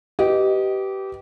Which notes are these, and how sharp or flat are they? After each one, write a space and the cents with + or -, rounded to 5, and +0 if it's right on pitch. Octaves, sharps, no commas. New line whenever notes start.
G4 -20 B4 +0 D#5 +0